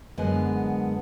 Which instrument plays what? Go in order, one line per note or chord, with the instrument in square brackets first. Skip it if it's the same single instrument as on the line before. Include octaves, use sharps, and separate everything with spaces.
[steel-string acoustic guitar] F#2 D3 G#3 B3